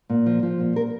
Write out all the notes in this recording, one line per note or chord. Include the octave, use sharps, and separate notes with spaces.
A#2
F3
F3
A#2
A#4